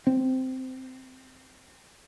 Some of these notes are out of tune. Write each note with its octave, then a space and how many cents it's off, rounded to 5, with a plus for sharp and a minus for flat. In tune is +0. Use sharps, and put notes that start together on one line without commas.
C4 -10